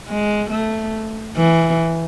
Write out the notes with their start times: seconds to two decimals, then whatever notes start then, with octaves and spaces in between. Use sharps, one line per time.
0.08 G#3
0.50 A3
1.37 E3